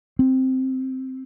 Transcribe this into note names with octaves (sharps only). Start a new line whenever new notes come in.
C4